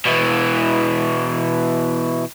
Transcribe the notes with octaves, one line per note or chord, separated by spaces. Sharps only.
B2 E3